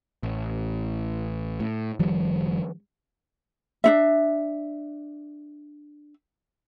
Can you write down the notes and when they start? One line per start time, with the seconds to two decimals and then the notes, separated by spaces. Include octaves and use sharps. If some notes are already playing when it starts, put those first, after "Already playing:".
0.23 A1
1.60 A2
1.99 F#1 D#3 F3 G3
3.84 D4 D#4 E5